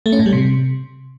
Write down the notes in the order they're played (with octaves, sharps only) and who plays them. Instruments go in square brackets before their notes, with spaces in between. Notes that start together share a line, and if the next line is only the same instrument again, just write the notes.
[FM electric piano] A3
C#4
A2
G3
C3